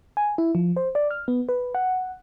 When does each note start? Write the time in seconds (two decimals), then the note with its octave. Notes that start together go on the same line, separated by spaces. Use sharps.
0.17 G#5
0.38 E4
0.55 F3
0.76 C5
0.95 D5
1.11 F6
1.28 B3
1.49 B4
1.75 F#5